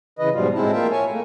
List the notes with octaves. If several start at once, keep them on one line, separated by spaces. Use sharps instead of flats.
C#3 E3 B4 D#5
G#2 B2 F3 G3 F4
A2 G#3 C4 E4 A5
A#3 F4 E5 G5 A5
C#5 G#5 A5
A3 A#3